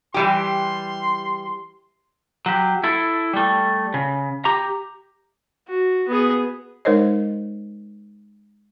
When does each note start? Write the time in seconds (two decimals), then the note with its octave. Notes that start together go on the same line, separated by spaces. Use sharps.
0.14 E3 G3 G4 C6
2.46 F#3 G4
2.84 E4 A4
3.33 G3 A3
3.94 C#3
4.45 G4 A#5
5.68 F#4
6.08 B3 G#4
6.85 G#3 D#4 A#4 C5 C#5 D#5